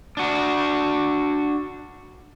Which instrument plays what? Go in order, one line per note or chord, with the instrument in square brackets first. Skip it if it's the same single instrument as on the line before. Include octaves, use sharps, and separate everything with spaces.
[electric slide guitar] D4 F#4